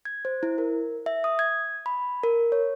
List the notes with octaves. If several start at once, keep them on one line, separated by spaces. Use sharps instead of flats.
G#6
C5
E4
A#4
E5
D#6
G#6
B5
A#4
C#5